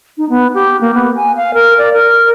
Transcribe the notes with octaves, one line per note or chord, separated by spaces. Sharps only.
D#4
B3
G4
A#3
B3
G#5
F5
A#4
D5
A#4